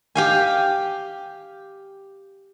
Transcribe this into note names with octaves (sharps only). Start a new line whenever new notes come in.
G4 F5 G#5